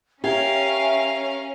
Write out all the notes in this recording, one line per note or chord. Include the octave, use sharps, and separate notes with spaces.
C#4 G4 A#4 E5 F5 G#5